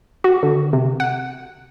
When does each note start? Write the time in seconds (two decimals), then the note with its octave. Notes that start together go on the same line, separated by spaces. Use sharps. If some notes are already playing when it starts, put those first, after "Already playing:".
0.24 F#4
0.43 D3
0.73 C3
1.00 F#5